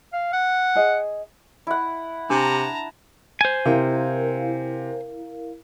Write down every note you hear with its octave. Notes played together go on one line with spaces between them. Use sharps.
F5
F#5
G#4 D#5
E4 F#5
C3 D4 A5 A#5
C5 G#5
C3 E4 A#4 F5